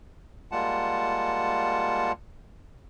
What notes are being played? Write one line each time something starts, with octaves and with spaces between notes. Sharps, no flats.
G3 G#3 A#3 F4 F#5 A5